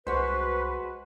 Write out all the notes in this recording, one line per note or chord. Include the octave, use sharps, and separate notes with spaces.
C2 G#3 F#4 B4 C5 C6 C#6